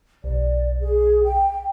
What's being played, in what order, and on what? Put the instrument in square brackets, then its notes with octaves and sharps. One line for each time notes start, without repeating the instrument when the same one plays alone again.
[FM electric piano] B1 [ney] D5
[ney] G#4
G5